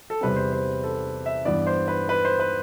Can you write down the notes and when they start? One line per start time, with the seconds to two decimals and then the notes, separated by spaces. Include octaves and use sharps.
0.10 A4
0.21 E2 C3 G3 C4 B4
0.36 C5
0.52 C5
0.84 A4
1.26 E5
1.45 G2 E3 B3 D5
1.67 C5
1.88 B4
2.09 B4
2.25 C5
2.40 B4